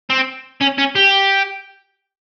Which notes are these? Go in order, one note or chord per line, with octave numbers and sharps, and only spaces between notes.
C4
C#4
C#4
G4